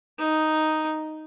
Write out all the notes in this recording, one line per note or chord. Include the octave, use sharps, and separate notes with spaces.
D#4